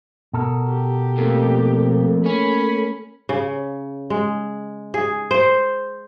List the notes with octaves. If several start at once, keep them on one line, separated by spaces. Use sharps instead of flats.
B2 A4 A#4
G4
F2 A3 A#3
C#4 B5
C#3
G#3
G#4
C5